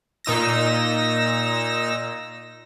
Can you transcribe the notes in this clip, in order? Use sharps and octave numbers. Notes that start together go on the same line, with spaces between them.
A#2 D#4 E6 A#6